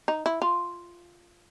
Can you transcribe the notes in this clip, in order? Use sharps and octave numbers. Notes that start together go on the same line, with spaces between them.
D#4
E4
F4